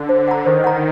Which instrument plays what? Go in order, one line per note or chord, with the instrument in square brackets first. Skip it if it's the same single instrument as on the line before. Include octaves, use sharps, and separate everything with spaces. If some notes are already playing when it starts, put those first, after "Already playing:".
Already playing: [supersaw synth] D3
[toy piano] C5
F#5 A#5
[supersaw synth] D#3 [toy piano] C5
[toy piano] F#5 A#5